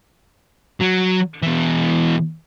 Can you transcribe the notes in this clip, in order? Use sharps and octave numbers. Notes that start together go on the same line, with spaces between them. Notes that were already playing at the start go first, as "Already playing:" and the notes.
F#3
B2 E3